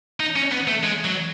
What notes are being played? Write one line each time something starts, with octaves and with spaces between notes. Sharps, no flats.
D#4
C#4
B3
A3
G#3
F#3